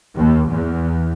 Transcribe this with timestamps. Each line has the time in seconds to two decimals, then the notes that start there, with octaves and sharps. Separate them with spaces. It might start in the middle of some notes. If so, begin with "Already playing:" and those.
0.17 D#2
0.50 E2